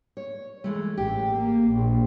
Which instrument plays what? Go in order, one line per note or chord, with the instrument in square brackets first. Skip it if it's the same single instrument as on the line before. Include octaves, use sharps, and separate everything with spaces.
[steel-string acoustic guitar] C#5
E3 G#3 A3
[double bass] A1 [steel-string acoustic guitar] G4
[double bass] A#3
A#1